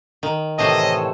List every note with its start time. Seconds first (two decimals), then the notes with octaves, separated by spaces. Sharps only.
0.23 D#3
0.59 A2 C3 E3 A4 C5 C#5 D#5